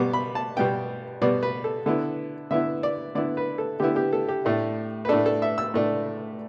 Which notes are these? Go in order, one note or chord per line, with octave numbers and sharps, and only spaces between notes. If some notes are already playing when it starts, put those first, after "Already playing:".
Already playing: B2 G3 B3 D6
B5
A5
B2 G3 B3 G5
B2 G3 B3 D5
B4
A4
D3 B3 E4 A4
D3 B3 E4 E5
D5
D3 B3 E4 D5
B4
A4
D3 B3 E4 G4
G4
A4
G4
A2 A3 D4
B4
A2 A3 D4 A4
A4
E5
E6
A2 A3 D4